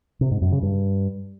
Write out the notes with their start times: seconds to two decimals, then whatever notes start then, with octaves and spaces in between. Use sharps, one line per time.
0.21 C3
0.31 G#2
0.42 F#2
0.52 C#3
0.63 G2